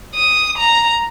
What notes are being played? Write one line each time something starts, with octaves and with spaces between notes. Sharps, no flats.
D#6
A#5